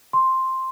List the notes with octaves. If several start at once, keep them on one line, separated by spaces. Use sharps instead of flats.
C6